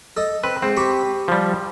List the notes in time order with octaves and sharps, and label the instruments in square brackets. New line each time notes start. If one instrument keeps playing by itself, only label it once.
[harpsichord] A4 D#5
[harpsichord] C4 [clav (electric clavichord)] B4
[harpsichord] G#2 [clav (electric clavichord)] C4
[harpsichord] G4 B5 C#6
[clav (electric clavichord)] F3 G3